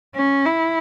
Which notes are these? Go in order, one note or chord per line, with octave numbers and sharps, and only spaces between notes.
C#4
E4